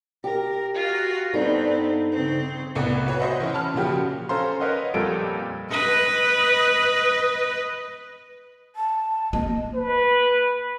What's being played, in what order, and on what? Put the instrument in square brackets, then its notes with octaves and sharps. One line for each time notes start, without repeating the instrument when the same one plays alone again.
[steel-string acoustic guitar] G4 [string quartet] A#4
[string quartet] F4 F#4
[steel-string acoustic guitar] G2 D#4 A4 [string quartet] B3 C4
[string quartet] C#3 C4
[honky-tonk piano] C2 A2 B3 B4 C#7
F#4 B4 C#5
C5 D#5 E5 F#5
E3 C#4
A5 B5 F6
A#2 C#3 F3 F#4 G4
[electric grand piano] C#4 A4 C5 F5 A#5 C6
A#4 B4 C#5 D#5 F5 F#5
F2 A#2 G3 A4 A#4 D7
[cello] B4 D#5
[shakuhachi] A5
[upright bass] A#3 [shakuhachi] D#5
[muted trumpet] B4